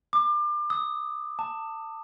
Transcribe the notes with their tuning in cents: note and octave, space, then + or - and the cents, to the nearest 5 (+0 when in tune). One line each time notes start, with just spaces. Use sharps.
D6 +30
D#6 +25
A5 +25